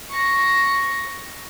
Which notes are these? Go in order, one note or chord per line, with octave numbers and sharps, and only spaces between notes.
C#6 A#6